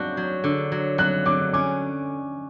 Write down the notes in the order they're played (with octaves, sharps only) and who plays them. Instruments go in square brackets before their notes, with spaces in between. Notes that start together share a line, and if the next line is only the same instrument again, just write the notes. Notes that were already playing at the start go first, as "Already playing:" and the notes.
Already playing: [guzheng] D4 F#4 [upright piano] G6
[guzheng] F#3
D3
F#3
[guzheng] F#3 [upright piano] F#6
[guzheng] D3 [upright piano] D6
[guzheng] C#4 [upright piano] D6